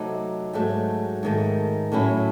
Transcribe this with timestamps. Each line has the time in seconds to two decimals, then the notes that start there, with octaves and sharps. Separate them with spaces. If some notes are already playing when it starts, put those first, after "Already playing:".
Already playing: C3 F#3 A3 D#4
0.53 G#2 F#3 A3
1.23 G#2 D#3 A3
1.92 A2 F#3 C#4 E4